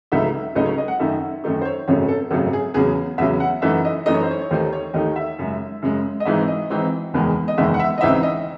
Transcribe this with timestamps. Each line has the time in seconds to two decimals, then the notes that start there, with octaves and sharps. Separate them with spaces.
0.12 C#2 C#3 F#3 A3 D#4 E5
0.55 C#2 C#3 F#3 A3 D#4 D#5
0.66 C#5
0.78 D#5
0.88 F#5
1.00 F#2 D#3 A3 D#4 E5
1.44 F#2 D#3 A3 D#4
1.61 C5
1.65 C#5
1.88 G#1 F#2 C#3 F#3 A3 C#5
2.08 A4
2.31 G#1 F#2 C#3 F#3 A3 A4
2.53 G#4
2.74 E2 C#3 F#3 G#4
3.18 E2 C#3 F#3 E5
3.40 F#5
3.62 F#2 E3 A3 D#4 E5
3.85 D#5
4.06 F#2 E3 A3 D#4 D#5
4.14 C#5
4.23 C5
4.31 C#5
4.41 C#5
4.51 D#2 D#3 A3 D#4 C5
4.73 C#5
4.94 D#2 D#3 A3 D#4 D#5
5.16 E5
5.39 F#2 C#3 G#3
5.82 F#2 C#3 G#3
6.20 D#5
6.25 G#1 G#2 E3 C4 D#4 E5
6.48 D#5
6.70 G#1 G#2 E3 C4 D#4
7.14 F#1 E2 D#3 G#3
7.48 D#5
7.58 F#1 E2 D#3 G#3 E5
7.74 F#5
7.80 E5
7.98 D#5
8.01 C#2 C#3 E3 C4 D#4 E5
8.23 D#5